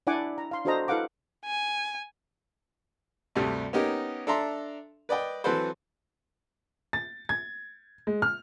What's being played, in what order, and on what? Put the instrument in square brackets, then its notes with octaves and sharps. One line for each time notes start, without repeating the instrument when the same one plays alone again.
[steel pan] D4 E4 D5 F#5 G#5 D6
A#5
F5 C6
D4 F#4 A4 C5 D#5 A#5
E4 A4 B4 F5 F#5 D6
[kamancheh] G#5
[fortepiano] D2 G2 C3 G3 A3
B3 C#4 D#4 G4 A#4
D4 A4 E5 A#5 C6
B4 D5 D#5 G5
E3 F#3 C4 A4 B4 C5
[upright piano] A6
G#6
G#3
F6